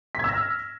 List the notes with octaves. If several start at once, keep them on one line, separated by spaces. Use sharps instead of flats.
E6 F6 G#6 A#6 B6